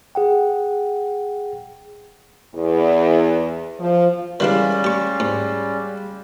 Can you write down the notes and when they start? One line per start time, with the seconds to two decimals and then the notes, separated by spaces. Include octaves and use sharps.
0.15 G#4 F#5 G5
2.54 E2
3.78 F3
4.40 D#3 E3 G3 G#3 C#4 D4 D5 F5
4.84 G4 C#6
5.20 G#2